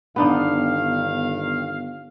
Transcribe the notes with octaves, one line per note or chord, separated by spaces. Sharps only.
G1 D#3 B3 D4 D#4 F5